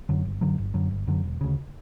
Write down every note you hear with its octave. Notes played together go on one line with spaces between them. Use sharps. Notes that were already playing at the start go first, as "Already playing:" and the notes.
F#2 D3 F#3
G1
F#2 D3 F#3
G1
F#2 D3 F#3
G1
F#2 D3 F#3
E1
D2 C#3